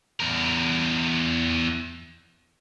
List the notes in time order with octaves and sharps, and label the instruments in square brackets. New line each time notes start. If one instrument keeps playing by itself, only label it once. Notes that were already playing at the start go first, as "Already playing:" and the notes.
[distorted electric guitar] E2 A#4